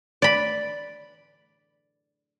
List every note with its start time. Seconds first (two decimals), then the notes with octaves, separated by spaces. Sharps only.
0.22 D5 B5